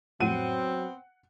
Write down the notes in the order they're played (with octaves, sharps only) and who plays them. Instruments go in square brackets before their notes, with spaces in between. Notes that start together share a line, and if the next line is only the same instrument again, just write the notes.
[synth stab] F2 A2 [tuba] F#3 [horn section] B3 C4 [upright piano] F#5 D#7